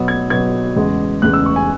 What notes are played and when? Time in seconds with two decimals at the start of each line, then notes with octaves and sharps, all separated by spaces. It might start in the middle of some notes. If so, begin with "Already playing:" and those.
Already playing: B2 F#3 B3
0.08 G#6
0.30 B2 F#3 B3 G#6
0.76 E2 C#3 G#3
1.22 E2 C#3 G#3 F#6
1.33 E6
1.46 C#6
1.56 G#5